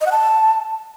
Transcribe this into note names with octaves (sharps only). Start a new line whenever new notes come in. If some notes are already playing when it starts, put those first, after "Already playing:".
D#5
F#5
A5